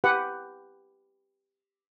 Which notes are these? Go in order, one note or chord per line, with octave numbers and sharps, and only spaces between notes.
G4 B4 F#5